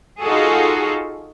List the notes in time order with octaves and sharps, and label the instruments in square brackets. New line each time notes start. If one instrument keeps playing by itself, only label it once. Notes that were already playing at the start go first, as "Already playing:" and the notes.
[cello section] D#4 F4 F#4 G#4 A4